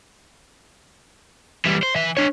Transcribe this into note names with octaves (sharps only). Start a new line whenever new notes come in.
E3 G3
C5
E3 E5
D4 C#5